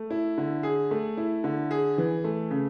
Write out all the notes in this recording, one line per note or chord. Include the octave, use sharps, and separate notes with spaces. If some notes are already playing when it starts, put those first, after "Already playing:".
Already playing: A3
E4
D3
G#4
A3
E4
D3
G#4
E3
A3
C#3